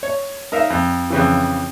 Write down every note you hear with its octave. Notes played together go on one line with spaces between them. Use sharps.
C#5
D#4 A#4 E5 F5
F2
F2 C#3 E3